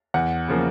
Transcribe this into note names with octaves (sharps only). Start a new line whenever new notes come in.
E2 F#5
C#3 F3 A#3